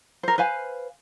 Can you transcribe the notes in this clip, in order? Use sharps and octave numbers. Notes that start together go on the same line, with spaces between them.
A#4 C5
B4 C5 F5 G#5